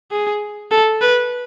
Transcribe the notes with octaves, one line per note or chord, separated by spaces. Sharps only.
G#4
A4
B4